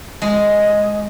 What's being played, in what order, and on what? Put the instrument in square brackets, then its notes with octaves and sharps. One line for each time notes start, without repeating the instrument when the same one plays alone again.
[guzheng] G#3